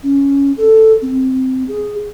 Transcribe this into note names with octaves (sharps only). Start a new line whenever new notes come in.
C#4
A4
C4
G#4